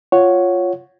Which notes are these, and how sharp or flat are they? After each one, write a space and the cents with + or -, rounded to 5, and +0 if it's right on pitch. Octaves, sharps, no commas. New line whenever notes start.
F4 +0 C#5 +0 F#5 +0